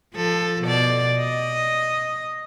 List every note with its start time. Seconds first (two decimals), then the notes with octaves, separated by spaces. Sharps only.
0.15 F3 A4
0.63 B2 D5
1.18 D#5